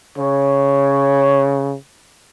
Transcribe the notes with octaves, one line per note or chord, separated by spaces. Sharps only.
C#3 C#5